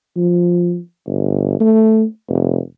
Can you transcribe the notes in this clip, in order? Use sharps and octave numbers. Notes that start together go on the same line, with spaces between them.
F3
G1
A3
F1